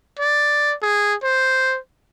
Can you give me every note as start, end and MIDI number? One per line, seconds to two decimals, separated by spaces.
0.20 0.75 74
0.82 1.14 68
1.23 1.78 72